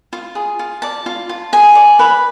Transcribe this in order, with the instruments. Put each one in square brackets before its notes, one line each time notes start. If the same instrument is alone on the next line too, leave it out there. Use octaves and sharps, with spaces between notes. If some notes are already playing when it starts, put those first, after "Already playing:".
[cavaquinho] F4
G#4
F4
D5 A5
F4
F4
G#4 G#5
D5
B4